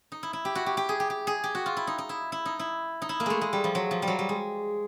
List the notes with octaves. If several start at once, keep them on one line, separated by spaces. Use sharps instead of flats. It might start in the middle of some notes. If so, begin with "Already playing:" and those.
D#4
E4
E4
G4
F#4
G4
G4
G#4
G4
G4
G#4
G4
F#4
F4
E4
D#4
D#4
E4
E4
D#4
E4
D#4
E4
A#3
G#3 A3
G#3
G3
F3
F#3
F3
G3
F#3
G3
G#3